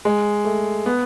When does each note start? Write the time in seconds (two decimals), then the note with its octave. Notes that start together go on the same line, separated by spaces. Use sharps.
0.05 G#3
0.45 A3
0.86 B3